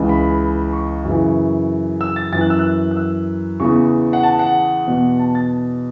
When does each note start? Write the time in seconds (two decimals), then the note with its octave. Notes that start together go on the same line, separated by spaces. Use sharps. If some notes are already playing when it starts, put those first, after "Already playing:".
Already playing: C#2 C#3 E3
0.09 B5
0.73 C#6
1.05 F#2 C#3 E3
2.01 E6
2.16 A6
2.32 F#2 E3 A6
2.41 F#6
2.50 E6
2.59 F#6
2.91 F#6
2.97 E6
3.60 E2 C#3 E3 C#6
4.13 F#5
4.23 A5
4.39 F#5
4.87 E2 B2
5.19 A5
5.35 A6